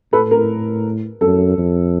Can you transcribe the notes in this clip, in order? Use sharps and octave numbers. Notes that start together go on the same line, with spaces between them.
A2 A4 B4
A#4
F#2 A4
F2